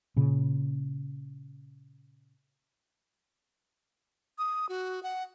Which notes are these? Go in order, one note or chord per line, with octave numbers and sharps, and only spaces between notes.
A#2 C#3
D#6
F#4
F#5